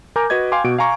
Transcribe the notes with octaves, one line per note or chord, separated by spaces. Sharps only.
A#4 G#5 A#5 D6 G6
F#4 B4 D#5 G#6
F5 G5 G#5 C6 D6
B2 F#4 D7
F5 G#5 A#5 C#6